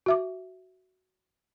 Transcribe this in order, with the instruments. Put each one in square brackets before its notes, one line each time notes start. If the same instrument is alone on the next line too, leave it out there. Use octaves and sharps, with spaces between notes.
[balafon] F#4 E5 D6